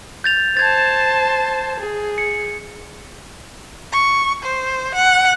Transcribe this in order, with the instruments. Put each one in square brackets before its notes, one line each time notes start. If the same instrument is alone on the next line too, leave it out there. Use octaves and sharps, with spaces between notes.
[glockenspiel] G6 A6 F7
[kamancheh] C5 A5 [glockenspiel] G#6 A6
[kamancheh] G#4
[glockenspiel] C#7
[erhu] C#6
C5
F#5